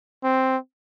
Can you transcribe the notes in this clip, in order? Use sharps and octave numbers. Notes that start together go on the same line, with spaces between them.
C4